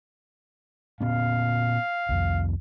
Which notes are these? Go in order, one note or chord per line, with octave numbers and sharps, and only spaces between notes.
A#2 B3 C#4 F5
C2 F2